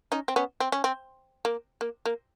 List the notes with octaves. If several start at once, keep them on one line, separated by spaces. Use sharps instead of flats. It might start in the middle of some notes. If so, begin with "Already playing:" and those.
C#4 D#4
C4
B3 C#4
C4
C#4
C4
A#3
A#3
A#3